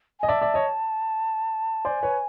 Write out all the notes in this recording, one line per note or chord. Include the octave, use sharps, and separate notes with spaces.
D#5 G#5
D5 E5 A5
D5 E5
C#5 D#5
C5 D5 G#5
B4 C#5